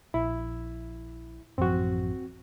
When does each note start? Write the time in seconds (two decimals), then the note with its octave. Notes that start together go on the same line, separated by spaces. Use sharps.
0.14 A#1 E4
1.58 A1 F#2 F3 C4 F#4